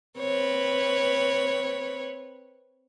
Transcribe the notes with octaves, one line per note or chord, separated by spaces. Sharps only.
C4 B4 C#5